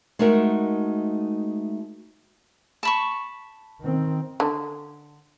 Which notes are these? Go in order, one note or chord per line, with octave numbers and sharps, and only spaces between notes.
G#3 A3 D#4 F#4 A#4 E5
A5 B5 C#6
D#3 C4
D3